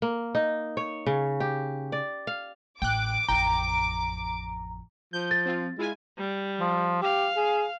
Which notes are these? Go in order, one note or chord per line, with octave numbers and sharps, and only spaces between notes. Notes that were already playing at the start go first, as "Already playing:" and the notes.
A#3
D#4
C#5
C#3
G4
D5
F5
A1 G5 D6 F#6
A1 F2 G5 A#5
F3 G6
A6
C4 F4
G#3 E4 F4 G#5
G3
F3
G4 F5
G#4